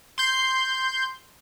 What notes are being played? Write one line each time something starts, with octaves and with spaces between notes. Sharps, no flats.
C6 G6